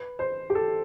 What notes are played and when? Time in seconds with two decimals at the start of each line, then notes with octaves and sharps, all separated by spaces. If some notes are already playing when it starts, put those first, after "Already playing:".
Already playing: B4
0.19 C5
0.50 G4
0.55 A4